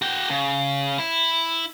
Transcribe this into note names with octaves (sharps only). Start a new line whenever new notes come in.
F#4 G5
C#3
E4